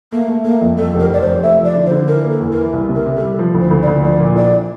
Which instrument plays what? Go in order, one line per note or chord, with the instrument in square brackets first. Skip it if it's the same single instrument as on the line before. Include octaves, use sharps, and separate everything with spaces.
[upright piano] A3 [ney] A#3
[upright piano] A3
[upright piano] A3 [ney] A#3
[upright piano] F2
[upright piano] F2 [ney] A4
[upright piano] F1
[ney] A#4
[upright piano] F1 [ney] D5
[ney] C5
[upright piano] F1
[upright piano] A3 [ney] E5
[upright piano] F3 [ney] D5
[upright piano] D3
[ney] C5
[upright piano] D3
[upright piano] E3 [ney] A#4
[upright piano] A#3
[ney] A4
[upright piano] E2
[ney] A#4
[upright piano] E3
C2
C3
[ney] A#4
[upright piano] C3
[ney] A4
[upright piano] G3
F3
D2
[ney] C5
[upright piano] D2
[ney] D5
[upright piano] D2
[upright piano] F3 [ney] D5
[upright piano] A#2
[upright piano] A#1 [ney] D5